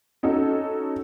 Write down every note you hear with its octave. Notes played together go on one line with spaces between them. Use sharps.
C#4 D#4 F#4 A4